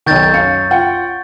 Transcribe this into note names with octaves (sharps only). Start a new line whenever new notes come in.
B1 D#3 C#6 G6 A6
F#2 F5 C#7
F4 F#5 G5